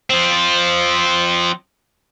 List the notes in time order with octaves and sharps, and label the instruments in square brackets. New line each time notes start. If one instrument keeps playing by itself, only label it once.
[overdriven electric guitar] F3 C4